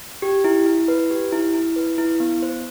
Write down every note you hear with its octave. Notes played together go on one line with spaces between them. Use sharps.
G4
E4
E4
B4
G4
E4
E4
B4
E4
B3
C5